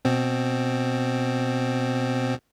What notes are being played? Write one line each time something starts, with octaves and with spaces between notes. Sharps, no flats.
B2 C4